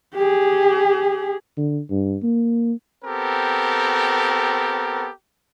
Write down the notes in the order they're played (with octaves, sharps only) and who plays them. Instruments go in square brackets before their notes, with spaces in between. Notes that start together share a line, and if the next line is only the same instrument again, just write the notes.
[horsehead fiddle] G4 G#4
[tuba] D3
G2
A#3
[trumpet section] B3 C4 G4 A4 A#4